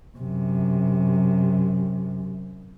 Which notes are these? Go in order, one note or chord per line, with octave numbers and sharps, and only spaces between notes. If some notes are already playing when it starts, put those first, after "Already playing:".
F#2 C3